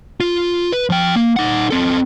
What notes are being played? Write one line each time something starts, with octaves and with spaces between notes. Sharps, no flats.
F4
B4
F3 G5
A#3
D#4 F#5
C4 A4